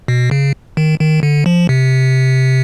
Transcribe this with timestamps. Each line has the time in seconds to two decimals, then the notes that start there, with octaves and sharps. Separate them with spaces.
0.08 B2
0.31 C#3
0.77 D#3
1.00 D#3
1.23 D3
1.46 F3
1.69 C3